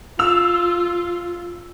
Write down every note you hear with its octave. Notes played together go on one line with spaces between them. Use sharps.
F4 E6 F7